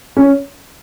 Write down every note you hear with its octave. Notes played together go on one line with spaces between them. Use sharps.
C#4